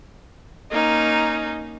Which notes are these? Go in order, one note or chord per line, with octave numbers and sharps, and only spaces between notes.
A#3 C#4 D#4